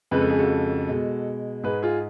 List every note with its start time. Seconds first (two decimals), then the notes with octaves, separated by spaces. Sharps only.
0.11 F2 C#3 G#3 B4
0.21 A4
0.30 G#4
0.38 F#4 A4
0.89 B2 G#3
1.64 G#2 G#3 G#4 B4
1.83 F4 G#4